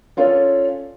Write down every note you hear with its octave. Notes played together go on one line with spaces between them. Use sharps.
C#4 F4 A4 C#5 D5